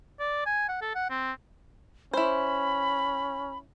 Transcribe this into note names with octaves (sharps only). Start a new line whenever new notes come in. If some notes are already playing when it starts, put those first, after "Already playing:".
D5
G#5
F#5
A4
F#5
C4
C#4 E4 C5 B5